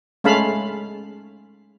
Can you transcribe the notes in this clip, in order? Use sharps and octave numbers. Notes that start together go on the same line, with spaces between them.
G#3 A3 C#4 F5 A5 B5